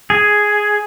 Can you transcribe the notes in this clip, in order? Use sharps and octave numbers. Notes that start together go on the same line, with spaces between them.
G#4